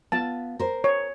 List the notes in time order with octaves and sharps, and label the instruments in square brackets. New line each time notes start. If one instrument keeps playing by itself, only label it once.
[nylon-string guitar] B3 F4 [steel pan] A5
[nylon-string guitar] A#4 C5
[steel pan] C#5